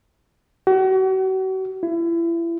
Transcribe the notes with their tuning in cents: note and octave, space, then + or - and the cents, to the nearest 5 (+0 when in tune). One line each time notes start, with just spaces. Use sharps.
F#4 +40
E4 +30